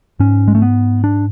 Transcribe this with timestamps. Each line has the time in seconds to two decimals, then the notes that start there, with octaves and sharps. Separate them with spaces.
0.20 G#2 C#4
0.48 G#3
0.55 A3
0.62 B3
1.04 D4